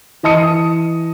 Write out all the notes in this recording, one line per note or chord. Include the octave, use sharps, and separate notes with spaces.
E3 D#5 A5 D#6 C#7 D#7